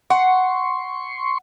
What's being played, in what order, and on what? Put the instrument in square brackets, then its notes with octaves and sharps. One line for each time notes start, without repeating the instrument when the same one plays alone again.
[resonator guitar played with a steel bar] F#5 [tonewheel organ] C6 C#6